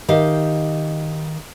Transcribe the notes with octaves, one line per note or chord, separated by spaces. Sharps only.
D#3 G4 D#5 F5